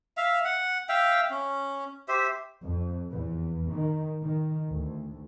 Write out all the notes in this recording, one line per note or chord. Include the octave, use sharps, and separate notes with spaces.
E5 F5
F#5
E5 F5 G5
C#4
G4 C5 E5
F2
E2
D#3
D#3
D2